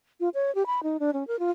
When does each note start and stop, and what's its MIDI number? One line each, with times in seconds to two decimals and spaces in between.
0.20 0.29 65
0.34 0.54 73
0.55 0.66 67
0.66 0.83 83
0.83 0.97 63
1.00 1.11 62
1.14 1.26 61
1.28 1.39 70
1.39 1.51 65